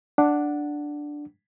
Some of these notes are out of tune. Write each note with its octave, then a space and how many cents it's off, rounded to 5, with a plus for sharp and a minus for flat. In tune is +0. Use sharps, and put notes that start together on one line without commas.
D4 +0 F#5 +0